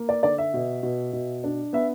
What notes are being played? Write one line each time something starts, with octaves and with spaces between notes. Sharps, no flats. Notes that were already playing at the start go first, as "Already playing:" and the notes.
Already playing: A#3
D5
D3 D5
E5
B2
B2
B2
D4
B3 E5